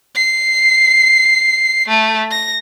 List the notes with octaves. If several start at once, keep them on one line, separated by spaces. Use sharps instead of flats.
C7
A3
A#6